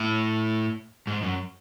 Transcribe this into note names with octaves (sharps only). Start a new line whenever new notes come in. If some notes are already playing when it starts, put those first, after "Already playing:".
Already playing: A2
G#2
F#2